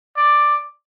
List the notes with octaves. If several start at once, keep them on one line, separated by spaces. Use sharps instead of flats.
D5